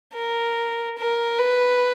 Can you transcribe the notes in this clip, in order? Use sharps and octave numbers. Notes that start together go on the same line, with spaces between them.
A#4
A#4
B4